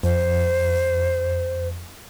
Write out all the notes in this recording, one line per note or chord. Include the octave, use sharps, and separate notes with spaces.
F2 C5